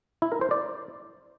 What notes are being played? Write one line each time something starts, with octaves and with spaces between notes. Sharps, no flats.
E4
A#4
C5
D5